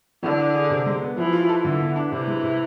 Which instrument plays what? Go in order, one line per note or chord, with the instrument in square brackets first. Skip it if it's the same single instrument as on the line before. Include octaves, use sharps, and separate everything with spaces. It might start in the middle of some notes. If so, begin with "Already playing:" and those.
[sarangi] D3 [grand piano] E3
[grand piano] D4
G#4
C3
G#3
B3
[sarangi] E3 [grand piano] F3
[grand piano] F4
A4
[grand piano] D3 [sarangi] E3
[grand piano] B3
D4
[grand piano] C3 [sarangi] E3
[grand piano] G#3
C3